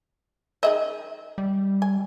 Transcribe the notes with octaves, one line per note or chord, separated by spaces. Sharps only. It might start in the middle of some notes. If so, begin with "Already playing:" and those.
D#3 G#3 D#5 E5
G3
G#5